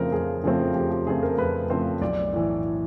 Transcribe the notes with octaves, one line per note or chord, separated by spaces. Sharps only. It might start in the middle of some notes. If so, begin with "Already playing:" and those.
Already playing: F2 C#3 F3 A3 C4 A#4
F2 G#4
C#3 F3 A3 C4 G#4
F2 G4
G4
C#3 F3 A3 C4 G#4
A#4
F2 B4
C#3 F3 A3 C4 C5
B1 D5
A2 E3